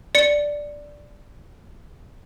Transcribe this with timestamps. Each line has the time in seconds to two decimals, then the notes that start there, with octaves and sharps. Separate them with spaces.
0.15 D5 C#7